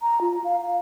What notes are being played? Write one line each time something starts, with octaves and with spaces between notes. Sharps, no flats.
A#5
F4
F5
F5